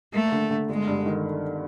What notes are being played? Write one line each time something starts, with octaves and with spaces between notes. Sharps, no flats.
A3 A#3
D3
D3
G1 G#3
G2
D#3